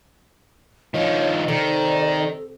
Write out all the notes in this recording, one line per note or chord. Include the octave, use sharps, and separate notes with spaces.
D#3 F3 C#5 D#5
C3 D#3 A4 D5